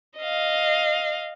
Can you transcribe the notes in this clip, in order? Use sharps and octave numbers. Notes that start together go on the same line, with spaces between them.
D#5 F5